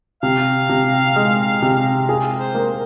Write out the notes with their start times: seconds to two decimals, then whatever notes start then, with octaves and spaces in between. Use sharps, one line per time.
0.23 C3 F5
0.69 C3
1.16 G#3
1.62 C3
2.09 G#4
2.39 C5
2.54 A#3